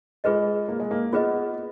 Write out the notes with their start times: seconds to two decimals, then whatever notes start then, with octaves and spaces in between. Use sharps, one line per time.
0.24 G#3 F4 G#4 B4 D#5
0.68 A#3
0.80 G#3
0.91 A#3
1.13 B3 F4 G#4 B4 D#5